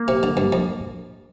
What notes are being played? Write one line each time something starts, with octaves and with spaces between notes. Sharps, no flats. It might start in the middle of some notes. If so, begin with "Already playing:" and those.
Already playing: A#3
C3
D3
G2
F2